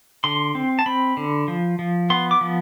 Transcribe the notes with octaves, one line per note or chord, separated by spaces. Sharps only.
D3 C6
C4
A5
C4 B5
D3
F3
F3
B3 C6
D6
F3